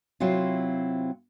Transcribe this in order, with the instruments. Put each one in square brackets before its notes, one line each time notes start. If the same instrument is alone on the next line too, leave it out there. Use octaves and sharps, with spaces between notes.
[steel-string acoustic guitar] C3 F#3 C4 E4 F4